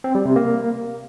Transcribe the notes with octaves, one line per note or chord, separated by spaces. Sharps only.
C4
G3
C3
A#3